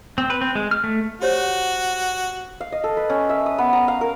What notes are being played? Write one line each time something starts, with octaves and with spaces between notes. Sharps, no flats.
C4
B4
C4
G#3
F6
A3
F#4 G4 C5 C#5
F5
D#5
A4
B4
C#4
E5
D#6
B3
A#5
F5
A#4